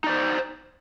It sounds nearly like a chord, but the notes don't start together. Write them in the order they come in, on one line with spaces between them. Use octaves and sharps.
D#4 D5 C5